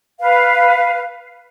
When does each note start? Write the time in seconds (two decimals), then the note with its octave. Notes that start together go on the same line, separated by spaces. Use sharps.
0.20 B4 F5